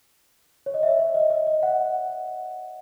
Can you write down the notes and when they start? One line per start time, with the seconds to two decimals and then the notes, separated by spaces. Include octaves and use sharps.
0.66 C#5
0.74 D#5
0.83 E5
0.99 C#5
1.15 D#5
1.30 D#5
1.47 D#5
1.63 F#5